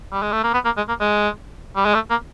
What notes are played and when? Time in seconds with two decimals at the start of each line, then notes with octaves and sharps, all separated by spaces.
0.13 G3
0.23 G#3
0.33 A3
0.44 A#3
0.54 B3
0.65 A#3
0.77 G#3
0.88 A#3
1.00 G#3
1.76 G3
1.85 G#3
1.94 A3
2.10 A#3